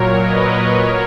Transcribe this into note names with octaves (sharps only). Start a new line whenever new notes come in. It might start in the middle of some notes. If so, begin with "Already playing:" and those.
Already playing: A#2 F#3 A#4 C#5
B4 D#5
F#3 A#4 C#5